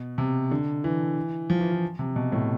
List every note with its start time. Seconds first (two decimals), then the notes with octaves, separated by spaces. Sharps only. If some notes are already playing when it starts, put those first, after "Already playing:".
Already playing: B2
0.18 C3
0.51 D3
0.84 E3
1.50 F3
1.60 E3
1.72 E3
1.99 C3
2.16 B2
2.32 A2